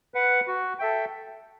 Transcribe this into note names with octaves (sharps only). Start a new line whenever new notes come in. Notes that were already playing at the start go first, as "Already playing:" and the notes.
B4 F#5
F#4
A4 E5 G5